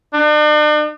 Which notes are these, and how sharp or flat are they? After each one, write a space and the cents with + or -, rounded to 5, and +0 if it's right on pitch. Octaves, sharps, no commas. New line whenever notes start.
D4 +45